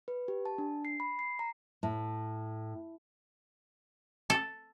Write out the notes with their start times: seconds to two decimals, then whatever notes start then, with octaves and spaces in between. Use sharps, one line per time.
0.08 B4
0.28 G4
0.46 A5
0.58 D4
0.85 C7
1.00 B5
1.19 C7
1.39 A#5
1.83 A2
4.30 A4